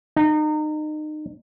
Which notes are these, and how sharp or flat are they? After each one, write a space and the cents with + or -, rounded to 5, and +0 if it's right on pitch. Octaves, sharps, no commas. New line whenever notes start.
D#4 -30